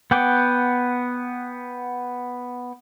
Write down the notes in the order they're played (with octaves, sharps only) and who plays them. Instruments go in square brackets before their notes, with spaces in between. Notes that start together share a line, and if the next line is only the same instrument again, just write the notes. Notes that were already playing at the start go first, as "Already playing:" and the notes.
[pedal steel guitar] B3 F#5 G5 D6